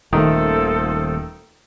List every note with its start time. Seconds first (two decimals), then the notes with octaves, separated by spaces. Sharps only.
0.13 D#1 D#3 A3 F4 A4 C5